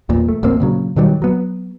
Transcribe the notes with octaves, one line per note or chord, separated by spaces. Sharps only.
A1 E2 A#2
A3
A1 D2 A#3 C4
A#2 C#3 F#3
B2 D#3 F#3 G3
F#3 B3